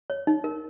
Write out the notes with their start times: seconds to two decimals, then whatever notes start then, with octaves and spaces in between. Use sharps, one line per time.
0.10 C#5
0.27 D#4
0.44 A#4